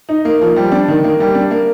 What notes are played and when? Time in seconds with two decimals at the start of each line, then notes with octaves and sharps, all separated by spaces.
0.09 D#4
0.25 A#3
0.41 F3
0.56 G3
0.72 D4
0.88 D#3
1.04 A#3
1.20 G3
1.35 D4
1.51 A#3